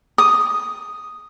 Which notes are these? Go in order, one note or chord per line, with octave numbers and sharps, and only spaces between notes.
D#6